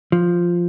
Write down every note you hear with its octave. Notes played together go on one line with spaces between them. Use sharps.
F3